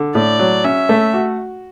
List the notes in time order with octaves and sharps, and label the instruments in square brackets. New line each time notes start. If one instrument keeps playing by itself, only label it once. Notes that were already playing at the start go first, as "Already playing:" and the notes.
Already playing: [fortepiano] D3
[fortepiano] A2 [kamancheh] D5
[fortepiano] F#3
[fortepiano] C#4 [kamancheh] E5
[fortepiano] A3
F#4